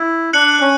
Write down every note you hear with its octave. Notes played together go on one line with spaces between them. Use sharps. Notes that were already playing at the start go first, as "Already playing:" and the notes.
Already playing: E4
D4 F#6 C#7 F#7
C#4